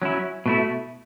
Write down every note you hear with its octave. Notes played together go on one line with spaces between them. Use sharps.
F#3 C#4 E4
B2 A3 E4